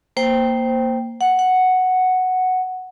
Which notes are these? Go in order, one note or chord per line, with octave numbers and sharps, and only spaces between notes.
A#3 C5 G5
F#5
F#5